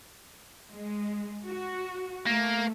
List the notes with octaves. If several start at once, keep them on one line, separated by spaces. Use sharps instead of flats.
G#3
F#4
A3 A#3